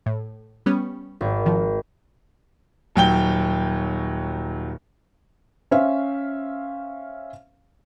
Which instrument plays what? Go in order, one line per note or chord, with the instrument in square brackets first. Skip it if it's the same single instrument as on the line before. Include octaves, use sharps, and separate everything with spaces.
[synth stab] A2
G3 B3 C#4
[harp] G#1
[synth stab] D#3 F3
[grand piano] D#1 F#3 G5 G7
[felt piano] C#4 C5 E5 F5